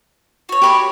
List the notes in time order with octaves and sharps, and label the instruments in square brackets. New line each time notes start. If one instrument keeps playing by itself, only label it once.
[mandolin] F#4 C#5
[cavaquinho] G4 B5 C#6